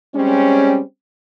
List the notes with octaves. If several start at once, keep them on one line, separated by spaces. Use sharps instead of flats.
G3 G#3 C4 C#4